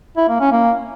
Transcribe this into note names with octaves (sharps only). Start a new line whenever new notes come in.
E4
A#3
C#4
A#3